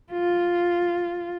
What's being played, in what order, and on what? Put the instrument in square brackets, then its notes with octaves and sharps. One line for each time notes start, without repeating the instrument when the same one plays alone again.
[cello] F4